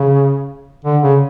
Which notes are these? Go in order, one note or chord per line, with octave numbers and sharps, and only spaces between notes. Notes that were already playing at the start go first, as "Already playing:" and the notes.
Already playing: C#3
D3
C#3